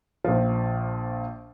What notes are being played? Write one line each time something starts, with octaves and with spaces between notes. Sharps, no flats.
A#1 F3